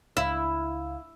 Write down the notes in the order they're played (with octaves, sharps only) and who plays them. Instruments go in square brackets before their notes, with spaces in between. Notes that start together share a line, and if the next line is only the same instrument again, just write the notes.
[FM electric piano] C#2 F5 [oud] E4